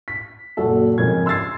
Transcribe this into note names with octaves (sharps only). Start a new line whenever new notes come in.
B6
F#1 A#2 F#4 A4
F2 G#2 C#3 A#4 G#5 G#6
C6 E6 G#6 A6 C7